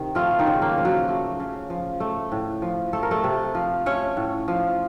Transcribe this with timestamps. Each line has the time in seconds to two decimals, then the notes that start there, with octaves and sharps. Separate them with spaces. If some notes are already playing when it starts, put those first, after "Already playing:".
Already playing: C3 D#3
0.15 F3 A3 F4
0.39 D#3 D#4
0.47 C#3
0.62 A#3
0.78 F3
0.85 F#3 F#4
1.08 A3
1.40 C#3
1.70 F3
2.00 A3
2.32 A2
2.62 F3
2.93 A3 A4
3.03 A#4
3.11 A3 A4
3.24 C3
3.55 F3
3.86 A3 C#4 C#5
4.17 A2
4.48 F3